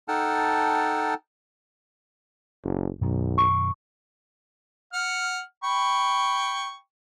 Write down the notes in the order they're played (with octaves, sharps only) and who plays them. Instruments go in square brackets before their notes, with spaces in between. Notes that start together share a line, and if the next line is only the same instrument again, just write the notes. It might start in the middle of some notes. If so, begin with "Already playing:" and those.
[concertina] D#4 A4 F#5 G5 A5 F6
[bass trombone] F#1
[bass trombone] B1 [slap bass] F#2 B2 D#3
[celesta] C#6
[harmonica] F#5 F6
G5 B5 C#6